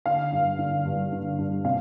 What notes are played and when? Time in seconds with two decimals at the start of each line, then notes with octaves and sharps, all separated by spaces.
0.06 D3 F5
0.32 G2
0.59 D3
0.85 G2
1.12 D3
1.38 G2
1.65 C3 F5